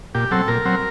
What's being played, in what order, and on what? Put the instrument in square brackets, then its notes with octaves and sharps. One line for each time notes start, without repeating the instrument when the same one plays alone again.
[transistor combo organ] A#2 G4
F#3 C4 A4
A#2 A#4
F#3 C4